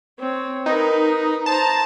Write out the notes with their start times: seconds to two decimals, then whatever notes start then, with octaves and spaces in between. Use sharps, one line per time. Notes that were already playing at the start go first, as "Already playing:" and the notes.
0.19 C4 C#5
0.66 D#4 A#4 B4
1.46 C5 A5 A#5